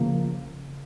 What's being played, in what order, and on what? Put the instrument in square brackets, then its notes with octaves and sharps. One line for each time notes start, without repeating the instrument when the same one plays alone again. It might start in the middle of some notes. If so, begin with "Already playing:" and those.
Already playing: [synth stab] C#3 F3 A#3